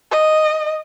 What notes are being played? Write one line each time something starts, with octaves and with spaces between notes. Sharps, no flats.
D#5